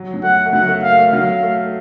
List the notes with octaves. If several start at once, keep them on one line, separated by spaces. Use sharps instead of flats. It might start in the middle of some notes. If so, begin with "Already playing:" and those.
Already playing: F#3
F#3
A3 F#5
A3
F#3 F#5
A3
A#3 F5
A3
F#3 F5
A3